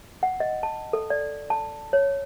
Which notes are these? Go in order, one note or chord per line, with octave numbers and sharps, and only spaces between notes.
F#5
D#5
A5
A4
D5
A5
C#5